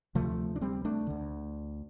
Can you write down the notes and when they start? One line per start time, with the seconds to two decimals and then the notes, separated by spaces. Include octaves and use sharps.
0.15 D2 C3 F3 A3
0.56 D4
0.61 G3 C4
0.85 A3 D4
1.07 D2 D3